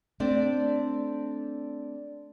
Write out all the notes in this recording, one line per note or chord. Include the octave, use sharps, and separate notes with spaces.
A3 C4 D4 D5